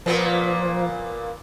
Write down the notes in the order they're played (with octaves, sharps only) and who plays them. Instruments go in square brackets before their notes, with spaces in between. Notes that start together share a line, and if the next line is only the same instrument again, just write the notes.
[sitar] A#2 A#3 B3 [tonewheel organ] F3